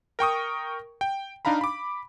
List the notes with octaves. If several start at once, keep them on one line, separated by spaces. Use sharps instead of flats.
A#4 G5 C#6 D#6
G5
D4 D#4 F5 A#5 B5
B5 D6